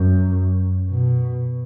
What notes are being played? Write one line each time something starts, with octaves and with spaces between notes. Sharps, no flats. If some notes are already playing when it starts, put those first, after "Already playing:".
Already playing: F#2
B2